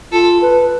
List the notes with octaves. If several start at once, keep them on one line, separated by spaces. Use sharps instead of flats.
F4 A4
B4